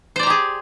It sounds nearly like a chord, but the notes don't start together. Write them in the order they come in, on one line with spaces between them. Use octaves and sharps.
C5 D5 A#5 G4 G#4